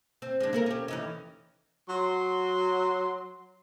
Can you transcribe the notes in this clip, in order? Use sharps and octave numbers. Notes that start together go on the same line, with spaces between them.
C4
G#3 D4
A#3 A4 A#4
C#4 G4
E3 C#4 D#4
F#3 C6